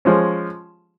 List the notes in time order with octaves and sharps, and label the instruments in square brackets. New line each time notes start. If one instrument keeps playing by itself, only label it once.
[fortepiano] F3 G#3 C#4